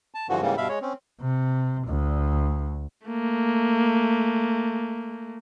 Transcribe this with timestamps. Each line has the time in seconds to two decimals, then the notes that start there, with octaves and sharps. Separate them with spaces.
0.14 A5
0.29 G2 D3 E3 F3 F#4
0.41 G#2 C#3 E3 G3 A#3
0.57 G2 B2 E5 F5 B5
0.69 G#3 C#5
0.82 C4 C#4
1.21 C3
1.87 D2
3.07 A3 A#3